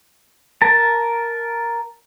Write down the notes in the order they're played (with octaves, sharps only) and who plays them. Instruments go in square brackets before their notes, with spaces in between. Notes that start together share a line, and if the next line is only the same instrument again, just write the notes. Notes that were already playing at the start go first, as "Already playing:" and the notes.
[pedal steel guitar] A#4 A5